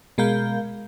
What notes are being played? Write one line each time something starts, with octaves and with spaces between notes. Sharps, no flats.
B2 G#3 A#4 F5 G6